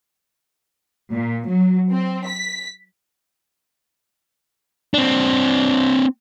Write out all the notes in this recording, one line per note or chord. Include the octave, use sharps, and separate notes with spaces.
A#2
F#3
C4
B6
C4 D4